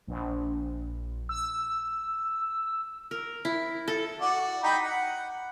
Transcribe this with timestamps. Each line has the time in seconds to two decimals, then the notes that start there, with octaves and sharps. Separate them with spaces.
0.08 A#1
1.29 E6
3.11 A#4
3.45 E4
3.88 A4
4.21 F#4 D5
4.63 D#4 G5 B5
4.83 F#5